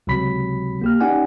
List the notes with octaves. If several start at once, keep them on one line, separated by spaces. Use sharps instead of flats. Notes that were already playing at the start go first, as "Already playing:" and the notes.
C#2 C3 F#3 B5 B6
A#3 G4 F6
C#4 D#4 G4 D5 F#5 G#5